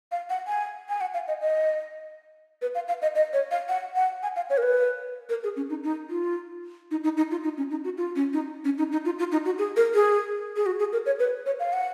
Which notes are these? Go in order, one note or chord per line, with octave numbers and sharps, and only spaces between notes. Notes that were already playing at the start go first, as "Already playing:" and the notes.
F5
F#5
G#5
G#5
F#5
F5
D#5
D#5
B4
F5
F5
D#5
D#5
C#5
F5
F#5
F#5
G#5
F5
C#5
A#4
B4
A#4
G#4
C#4
D#4
D#4
F4
D#4
D#4
D#4
F4
D#4
C#4
D#4
F#4
F4
C#4
D#4
C#4
D#4
D#4
F4
F4
D#4
F#4
G#4
A#4
G#4
G#4
F#4
G#4
A#4
C#5
B4
C#5
F5
F#5